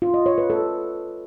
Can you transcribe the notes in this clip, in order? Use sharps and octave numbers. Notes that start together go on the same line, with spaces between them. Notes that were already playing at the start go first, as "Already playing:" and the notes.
F4
D#5
C#5
B4
A4